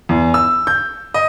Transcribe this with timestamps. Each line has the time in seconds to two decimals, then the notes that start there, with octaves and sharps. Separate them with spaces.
0.09 E2
0.34 E6
0.67 G6
1.14 D#5